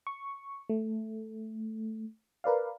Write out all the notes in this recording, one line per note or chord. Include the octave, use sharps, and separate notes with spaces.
C#6
A3
A#4 B4 D5 F5